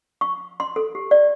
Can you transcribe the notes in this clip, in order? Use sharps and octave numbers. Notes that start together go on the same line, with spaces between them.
C#6
C6
A4
G4
D5